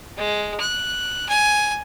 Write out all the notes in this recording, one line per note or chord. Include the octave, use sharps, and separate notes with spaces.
G#3
F#6
G#5